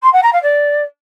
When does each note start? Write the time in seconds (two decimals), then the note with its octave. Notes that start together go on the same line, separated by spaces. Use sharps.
0.03 C6
0.13 F#5
0.23 A#5
0.32 F5
0.42 D5